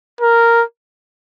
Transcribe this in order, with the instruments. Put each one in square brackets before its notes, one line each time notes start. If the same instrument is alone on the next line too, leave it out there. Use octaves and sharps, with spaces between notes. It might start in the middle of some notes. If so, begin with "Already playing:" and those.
[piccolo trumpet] A#4